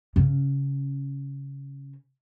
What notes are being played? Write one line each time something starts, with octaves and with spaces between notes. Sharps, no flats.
C#3 C#4